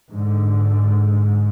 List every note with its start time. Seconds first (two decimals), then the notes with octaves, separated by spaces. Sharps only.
0.11 G#2 D3